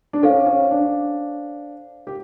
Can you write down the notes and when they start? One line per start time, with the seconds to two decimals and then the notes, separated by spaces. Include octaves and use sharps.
0.13 D4
0.23 C#4 A4 C5 F5
0.46 C#4
0.71 D4
2.07 G4